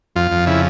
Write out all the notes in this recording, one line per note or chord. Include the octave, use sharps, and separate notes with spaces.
F2 F4
F2
C#3 E4